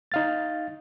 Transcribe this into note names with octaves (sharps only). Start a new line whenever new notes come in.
D#4 F5 A6